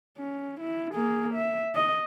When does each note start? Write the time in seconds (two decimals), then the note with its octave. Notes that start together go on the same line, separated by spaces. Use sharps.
0.18 C#4
0.60 E4
0.94 A#3 G#4
1.34 E5
1.75 D#5